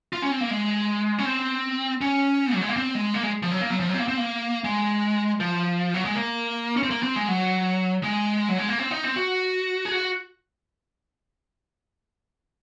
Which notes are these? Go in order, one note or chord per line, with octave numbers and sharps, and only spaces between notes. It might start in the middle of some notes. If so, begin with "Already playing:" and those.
F4
C#4
C4
A#3
G#3
C#4
C4
C#4
F#3
G#3
A#3
C4
G#3
A#3
G#3
F3
F#3
A#3
F#3
F3
F#3
C4
A#3
C4
A#3
G#3
F3
F#3
G#3
A#3
C#4
C4
A#3
C4
G#3
F#3
G#3
F#3
G#3
A#3
C4
D#4
C4
F#4
G#4
F#4